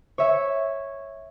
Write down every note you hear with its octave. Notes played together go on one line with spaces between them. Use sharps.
C#5 E5 C#6